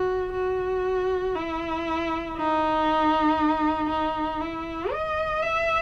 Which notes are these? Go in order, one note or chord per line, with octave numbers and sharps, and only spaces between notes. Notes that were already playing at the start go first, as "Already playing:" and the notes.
Already playing: F#4
F#4
E4
D#4
D#4
E4
D#5
E5